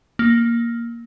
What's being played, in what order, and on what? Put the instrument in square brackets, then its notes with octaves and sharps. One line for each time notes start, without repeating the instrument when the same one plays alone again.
[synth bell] A#3